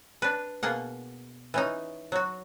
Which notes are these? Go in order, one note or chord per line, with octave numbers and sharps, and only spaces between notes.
D4 B4
B2 A#3 G#4 F#5
E3 C#4 D#4
F#3 F#4